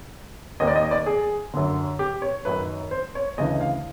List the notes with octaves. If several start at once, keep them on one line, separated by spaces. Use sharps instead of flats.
D#2 D#3 D#5
D5
D#5
D5
G#4
F#2 D3
G4
C#5
F#2 D#3 B4
C5
C#5
D2 C#3 E3 D#5
F5